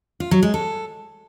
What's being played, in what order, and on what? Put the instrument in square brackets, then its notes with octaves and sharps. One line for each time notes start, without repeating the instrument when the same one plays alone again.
[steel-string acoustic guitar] F4
F#3
G#3
A4